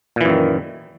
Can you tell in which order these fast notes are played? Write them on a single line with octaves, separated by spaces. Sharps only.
A#2 E3 F#2 D#3